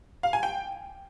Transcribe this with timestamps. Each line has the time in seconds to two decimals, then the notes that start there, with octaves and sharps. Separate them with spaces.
0.23 F5
0.33 G#5
0.43 G5